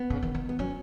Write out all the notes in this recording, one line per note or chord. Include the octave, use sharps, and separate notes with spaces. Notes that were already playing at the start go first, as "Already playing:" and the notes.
Already playing: B3
C#3
D#3
D#3
B3
F#3 C#4